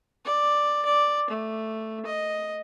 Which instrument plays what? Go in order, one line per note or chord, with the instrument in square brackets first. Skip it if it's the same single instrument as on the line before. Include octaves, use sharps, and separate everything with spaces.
[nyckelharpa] D5
D5
A3
D#5